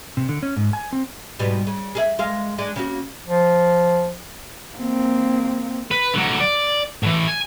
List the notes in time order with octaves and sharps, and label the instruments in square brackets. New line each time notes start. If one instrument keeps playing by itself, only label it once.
[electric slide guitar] C3
D3
C#4
G#2
G#5
C4
[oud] G#2 B2 G3
C#3
G#4 A4 E5
G#3 A#4 F5
G#3 D4
C#3 A#3 F#4
[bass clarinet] F3
[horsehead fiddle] A#3 C4
[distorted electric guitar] B4
D3 F#3
D5
A2 E3
G#5